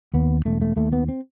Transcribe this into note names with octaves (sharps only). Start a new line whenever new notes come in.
D#2 B3
E1 A3
A3
D#2 A3
B3
C4